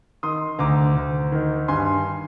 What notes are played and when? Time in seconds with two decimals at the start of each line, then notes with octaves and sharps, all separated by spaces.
0.23 D#3 C6 D#6
0.59 D2 A#5 D6
0.96 D2
1.32 D#3
1.68 G2 G#5 C6